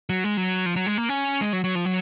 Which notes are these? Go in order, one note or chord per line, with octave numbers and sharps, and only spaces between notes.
F#3
G#3
F#3
F3
F#3
G#3
A#3
C#4
G#3
F#3
F#3
F3
F#3